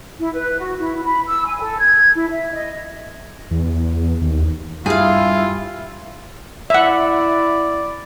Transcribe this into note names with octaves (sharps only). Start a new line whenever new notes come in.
E4
B4
F#4
E4
B5
E6
G#5
A4
G#6
E4
E5
D#5
E2
D#2
G2 E4 F4 G#4 F5
E4 D5 E5 F#5